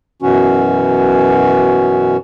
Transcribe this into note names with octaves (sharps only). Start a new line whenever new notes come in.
F#2 B2 E3 C#4 F#4